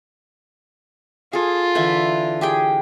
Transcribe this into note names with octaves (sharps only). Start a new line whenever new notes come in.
F4 G#4 A4
D3 E3 E4
G4 G#4 G5